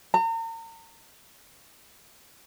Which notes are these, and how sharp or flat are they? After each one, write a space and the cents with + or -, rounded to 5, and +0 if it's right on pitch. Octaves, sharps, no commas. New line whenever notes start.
A#5 -40